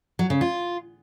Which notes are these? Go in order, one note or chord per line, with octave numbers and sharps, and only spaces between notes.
F#3
C#3
F4